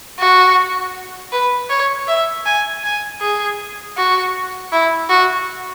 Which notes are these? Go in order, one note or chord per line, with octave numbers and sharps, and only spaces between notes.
F#4
B4
C#5
E5
G#5
G#5
G#4
F#4
E4
F#4